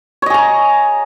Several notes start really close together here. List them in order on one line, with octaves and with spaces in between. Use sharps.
C#5 D#5 G#4 A#5